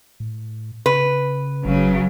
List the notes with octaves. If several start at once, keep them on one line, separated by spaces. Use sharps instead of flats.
A2
C#3 B4
G1 C#3 F#3